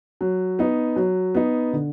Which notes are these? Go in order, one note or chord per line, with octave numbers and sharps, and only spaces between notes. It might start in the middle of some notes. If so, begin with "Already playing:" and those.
F#3
B3 D#4
F#3
B3 D#4
D3